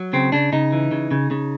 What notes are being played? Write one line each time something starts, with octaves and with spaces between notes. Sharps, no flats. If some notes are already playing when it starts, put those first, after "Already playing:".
Already playing: F#3
C#3 C4
C#3 D4
C#3 D#4
E3
C#3
C#3
C#3